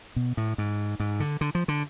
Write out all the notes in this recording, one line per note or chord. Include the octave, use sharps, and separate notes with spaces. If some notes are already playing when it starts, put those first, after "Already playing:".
B2
A2
G#2
G#2
D3
D3
F3
D3